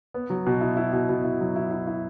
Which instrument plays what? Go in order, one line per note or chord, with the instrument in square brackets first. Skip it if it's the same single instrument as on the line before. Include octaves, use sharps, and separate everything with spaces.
[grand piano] B3
F#3
B2
E4
E4
B2
B2
E4
F#3
E4
E4
E4